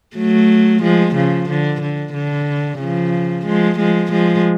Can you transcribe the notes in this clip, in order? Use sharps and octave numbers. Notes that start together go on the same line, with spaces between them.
F#3 A3
F3 G#3
C#3 F3
D3
D3
D3
C#3 F3
F3 G#3
F3 G#3
F3 G#3